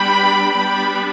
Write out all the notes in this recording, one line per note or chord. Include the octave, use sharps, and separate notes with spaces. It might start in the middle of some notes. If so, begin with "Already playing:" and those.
Already playing: G3 B3 D4 G5 B5
G3 B3 D4 G5 B5